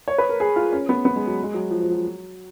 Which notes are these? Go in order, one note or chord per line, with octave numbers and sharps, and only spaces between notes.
C#5
B4
A#4
G#4
F4
C#4
B3
B3
G#3
F#3
G#3
F#3
F3
F3
F#3